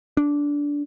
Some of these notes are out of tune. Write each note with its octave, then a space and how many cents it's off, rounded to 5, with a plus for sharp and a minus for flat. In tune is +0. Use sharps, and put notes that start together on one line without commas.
D4 -15